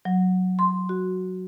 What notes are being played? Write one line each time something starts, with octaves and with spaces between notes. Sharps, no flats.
F#3
C6
F#4